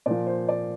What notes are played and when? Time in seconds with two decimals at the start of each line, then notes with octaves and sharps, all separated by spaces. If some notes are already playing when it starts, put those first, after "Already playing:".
0.06 A#2 F3 D5
0.27 C5
0.49 D5